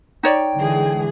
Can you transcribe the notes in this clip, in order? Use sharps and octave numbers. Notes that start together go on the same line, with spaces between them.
D#4 C#5 D5 G5
D3 E3 G#3 G#4